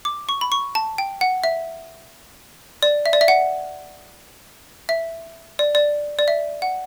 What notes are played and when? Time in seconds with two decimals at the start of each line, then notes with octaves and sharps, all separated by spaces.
0.05 D6
0.29 C#6
0.41 B5
0.52 C#6
0.75 A5
0.98 G5
1.21 F#5
1.44 E5
2.83 D5
3.06 E5
3.13 D5
3.21 E5
3.28 F#5
4.89 E5
5.59 D5
5.75 D5
6.19 D5
6.28 E5
6.62 F#5